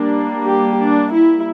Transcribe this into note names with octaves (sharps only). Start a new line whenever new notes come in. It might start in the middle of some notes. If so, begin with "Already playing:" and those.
Already playing: G3 A#3 D4
G4
D4
E4